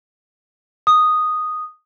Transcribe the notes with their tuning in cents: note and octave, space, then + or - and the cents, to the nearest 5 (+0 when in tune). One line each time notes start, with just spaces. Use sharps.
D#6 -5